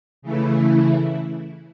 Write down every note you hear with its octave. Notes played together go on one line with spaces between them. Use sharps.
C#3 E3 A3 E4